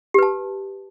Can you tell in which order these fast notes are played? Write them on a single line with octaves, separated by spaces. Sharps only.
G4 B4 A5